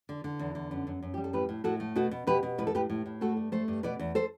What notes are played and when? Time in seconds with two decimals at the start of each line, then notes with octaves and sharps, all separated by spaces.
0.09 D3
0.24 D3
0.39 E2
0.55 D3
0.71 F#2
0.87 F#2
1.03 F#2
1.14 G3 G4
1.24 A4
1.33 A2 G4 B4
1.49 A2
1.64 A2 F#4 A4
1.80 A3
1.96 B2 F#4 A4
2.11 B2
2.27 B2 G4 B4
2.43 B2
2.58 A2 B4
2.67 A4
2.75 A2 G4 B4
2.90 A2
3.06 A2
3.21 A3 F#4 A4
3.37 G2
3.52 A3 A4 C5
3.68 G2
3.83 B2 B4 D5
3.99 E2
4.15 A4 C5